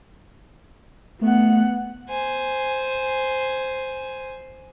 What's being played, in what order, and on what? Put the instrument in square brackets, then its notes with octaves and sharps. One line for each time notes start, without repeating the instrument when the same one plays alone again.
[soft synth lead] A3 [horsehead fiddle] B3 F#5
[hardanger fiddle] C5 G#5